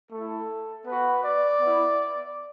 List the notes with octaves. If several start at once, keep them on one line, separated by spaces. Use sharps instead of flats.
A3 E4 A4
B3 F#4 B4
D5
B3 E4